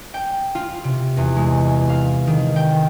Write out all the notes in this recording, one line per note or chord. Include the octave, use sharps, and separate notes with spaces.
G5
F4
C3
E2
G#3
F5
D#3
G5